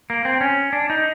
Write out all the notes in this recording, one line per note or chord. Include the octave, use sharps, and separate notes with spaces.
A#3
C4
C#4
D4
D#4